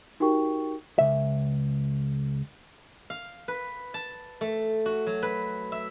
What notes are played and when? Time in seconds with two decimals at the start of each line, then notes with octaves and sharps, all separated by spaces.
0.20 D#4 F#4 G4 A#4 G5 C#6
0.99 C#2 E5
3.10 F5
3.48 B4
3.94 A5
4.41 A3
4.86 F#4
5.07 F#3
5.23 B4
5.72 E5